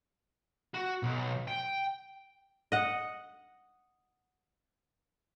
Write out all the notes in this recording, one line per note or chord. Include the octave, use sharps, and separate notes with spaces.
F#4
B1
G5
D#5 F#5